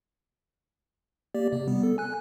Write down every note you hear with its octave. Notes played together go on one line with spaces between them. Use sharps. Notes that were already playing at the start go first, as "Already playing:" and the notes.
A#3 G4 D5
C3
G3 B3
A4
G#5 F#6